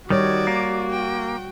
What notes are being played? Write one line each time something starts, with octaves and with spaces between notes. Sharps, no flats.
D#3 G3 F#4 C#5 D5
A#3
G5